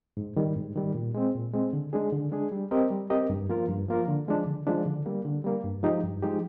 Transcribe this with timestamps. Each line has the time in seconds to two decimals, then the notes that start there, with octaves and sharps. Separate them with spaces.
0.17 G#2
0.37 D#3 G3
0.56 G#2
0.76 D#3 G3
0.95 A#2
1.15 G#3 C4
1.35 A#2
1.53 G#3 C4
1.73 D3
1.93 G#3 D4 G#4
2.13 D3
2.32 G#3 D4 G#4
2.52 G3
2.71 C4 G4 A#4 D#5
2.91 G3
3.10 C4 G4 A#4 D#5
3.30 G2
3.49 F3 A#3 F4 A#4
3.69 G2
3.88 F3 A#3 F4 A#4
4.08 D3
4.28 F3 G#3 D4
4.46 D3
4.67 F3 G#3 D4
4.86 D3
5.06 G3 A#3
5.25 D3
5.44 G3 A#3
5.64 G2
5.83 F3 G#3 D#4 G4
6.04 G2
6.22 F3 G#3 D#4 G4